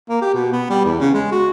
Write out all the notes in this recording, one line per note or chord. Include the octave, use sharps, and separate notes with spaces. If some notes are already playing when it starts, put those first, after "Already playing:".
A#3
G4
B2
B3
G3
E2
C#3
G#3
F#4